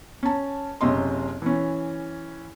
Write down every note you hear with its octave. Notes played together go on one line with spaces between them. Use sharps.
C#4 A5
F#1 C3 C#4 D#5 C6
E3 C#4